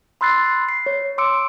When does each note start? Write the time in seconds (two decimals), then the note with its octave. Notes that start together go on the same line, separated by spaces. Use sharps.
0.21 B5 C6 E6 F#6 A6 C7
0.69 C7
0.86 C#5
1.18 C6 D6 E6 C#7 D7